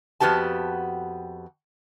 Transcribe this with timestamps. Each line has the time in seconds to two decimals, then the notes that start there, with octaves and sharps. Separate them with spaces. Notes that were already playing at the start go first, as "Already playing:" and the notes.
0.20 F2 B3 F#4 G4 A5